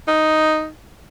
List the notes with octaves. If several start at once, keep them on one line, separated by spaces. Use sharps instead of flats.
D#4